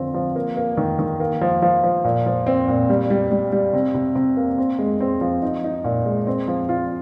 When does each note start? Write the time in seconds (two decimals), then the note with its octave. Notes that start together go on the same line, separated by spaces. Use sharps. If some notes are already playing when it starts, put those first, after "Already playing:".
Already playing: D3 F3 C4
0.14 F3
0.36 A#3
0.57 A#3
0.77 D#3
0.99 D#3
1.20 A#3
1.41 F3
1.62 F3
1.83 F3
2.04 A#2
2.26 F3
2.47 C4
2.68 A#2
2.89 G3
3.10 G3
3.31 G3
3.52 G3
3.73 C3
3.94 C3
4.15 C3
4.37 A#3
4.58 C4
4.79 G#3
5.00 C4
5.21 F3
5.42 D#4
5.64 D#4
5.84 A#2
6.06 G#3
6.27 C4
6.48 F3
6.69 F4